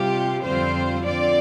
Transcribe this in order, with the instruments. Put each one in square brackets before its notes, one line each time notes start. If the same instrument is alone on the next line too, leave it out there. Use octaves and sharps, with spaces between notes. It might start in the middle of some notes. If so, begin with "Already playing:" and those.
Already playing: [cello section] C3 G3 F4 G4
F2 D3 G3 C4 F4 C5
D3 F3 C4 F4 D5